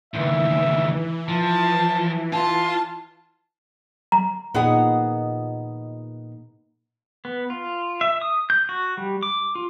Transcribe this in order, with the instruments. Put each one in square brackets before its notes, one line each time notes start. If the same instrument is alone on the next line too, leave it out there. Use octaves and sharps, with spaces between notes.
[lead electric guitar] C#2 D#3 [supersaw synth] E3 [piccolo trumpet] E5
[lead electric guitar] F3 [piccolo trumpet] A5
[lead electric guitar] F4 [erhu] A5 [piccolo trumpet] C6
[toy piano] A#5
[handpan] A#2 D#4 D#5 [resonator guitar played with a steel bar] B3 G#4 F#5
[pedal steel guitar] B3
F4
E5
D#6
G6
F#4
G3
D6
F4